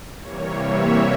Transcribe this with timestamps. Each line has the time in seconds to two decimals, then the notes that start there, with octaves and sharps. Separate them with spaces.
0.19 C3 E3 G3 A#3 C#5
0.56 E5